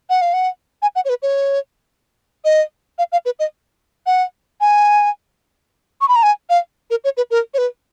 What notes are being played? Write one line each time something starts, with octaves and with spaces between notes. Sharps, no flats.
F#5
F5
F#5
G#5
F#5
C#5
B4
C#5
D#5
F5
F5
B4
D#5
F#5
G#5
C#6
B5
A#5
G#5
F5
A#4
C#5
B4
A#4
C#5
B4